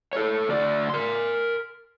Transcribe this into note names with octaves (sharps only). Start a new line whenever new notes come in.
A4 C#5
D2 D5
A#4 C6